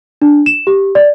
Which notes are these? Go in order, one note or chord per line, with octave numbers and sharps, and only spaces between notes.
D4
E7
G4
D5